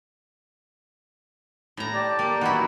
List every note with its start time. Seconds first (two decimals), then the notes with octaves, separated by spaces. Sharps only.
1.77 A2 A#5
1.94 G4 D5 A5
2.19 A#3
2.41 E3 F#3 D#4 E4 F#4 F#5